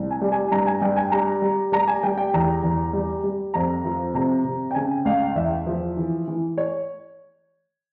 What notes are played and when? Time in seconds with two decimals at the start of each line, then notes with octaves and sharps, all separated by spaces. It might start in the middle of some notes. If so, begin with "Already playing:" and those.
Already playing: C2
0.11 G#5
0.21 G3
0.32 G#5
0.52 G2 A#5
0.66 G#5
0.82 G2 G5
0.96 G#5
1.12 G3 A#5
1.42 G3
1.72 G3 A#5
1.88 G#5
2.03 G3 G5
2.18 G5
2.34 E2 A#5
2.63 E2
2.93 G3
3.24 G3
3.54 F2 A#5
3.85 F3
4.14 C3 A#5
4.45 C3
4.71 G5
4.75 C#3 G#5
5.05 C#2 F5
5.35 E2 E5
5.67 F3
5.97 E3
6.27 E3
6.58 C#5